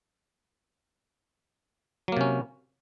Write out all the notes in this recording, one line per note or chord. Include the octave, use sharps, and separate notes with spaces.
C3 F#3 A#3 C#4